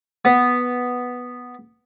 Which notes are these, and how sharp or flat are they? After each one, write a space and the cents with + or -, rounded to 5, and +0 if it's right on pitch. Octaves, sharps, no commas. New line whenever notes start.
B3 +0